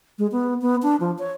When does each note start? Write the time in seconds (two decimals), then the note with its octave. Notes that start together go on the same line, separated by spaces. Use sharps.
0.18 G#3
0.32 B3
0.62 B3
0.83 D4
1.00 F3
1.19 C#5